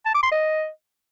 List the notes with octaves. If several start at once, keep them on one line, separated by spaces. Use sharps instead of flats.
A5
D6
C6
D#5